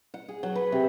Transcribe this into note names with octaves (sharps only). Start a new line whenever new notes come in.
F#5
G#4
F#3
B4
C3